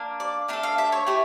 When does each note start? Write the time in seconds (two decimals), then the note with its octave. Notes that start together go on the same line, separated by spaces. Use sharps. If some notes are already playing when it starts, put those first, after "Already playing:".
Already playing: A#3 D4
0.20 D5
0.48 A3 D4 A4 A#4
0.63 F5
0.78 E5
0.92 C#5
1.06 A3 E4 G4 C#5